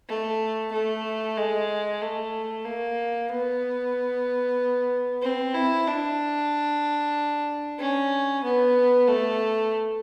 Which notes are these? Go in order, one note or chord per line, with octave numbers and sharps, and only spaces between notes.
A3
A3
G#3
A3
A#3
B3
C4
E4
D4
C#4
B3
A3